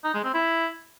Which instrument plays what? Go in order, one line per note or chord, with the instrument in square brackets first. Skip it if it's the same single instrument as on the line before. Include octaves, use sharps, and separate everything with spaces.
[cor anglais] D#4
G#3
C4
E4